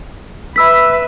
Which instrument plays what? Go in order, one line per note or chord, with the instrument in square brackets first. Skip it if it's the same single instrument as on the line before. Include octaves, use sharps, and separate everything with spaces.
[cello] B4 E5 [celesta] B5 E6 B6